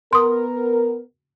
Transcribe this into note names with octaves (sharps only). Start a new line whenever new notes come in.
B3 A#4 C6 D#6